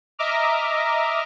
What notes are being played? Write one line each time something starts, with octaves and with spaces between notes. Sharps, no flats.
D#5 E5 A#5 D6 F6